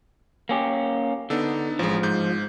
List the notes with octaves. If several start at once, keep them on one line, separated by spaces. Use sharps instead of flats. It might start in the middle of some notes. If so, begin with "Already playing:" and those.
A#3 C#4 G4
D3 B3 D#4 A4
A1 F3 G#3
G#2 G6